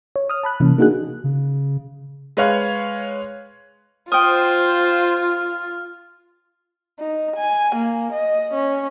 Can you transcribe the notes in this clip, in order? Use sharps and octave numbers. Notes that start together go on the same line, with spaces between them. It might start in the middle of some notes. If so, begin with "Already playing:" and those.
C#5
D#6 F6
A5 B5 F#6
C3 E3 A#3 C#4
A#3 D4 D#4 F#4 G#4 F#6
C#3
G#3 B4 C#5 F5 G#6
F4 C5 G5 D#6 F6
D#4
G#5
A#3
D#5
C#4